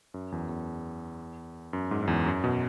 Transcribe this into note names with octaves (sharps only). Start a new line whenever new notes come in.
F#2
E2
E2
F#2
G#2
F#2
E2
F#2
B2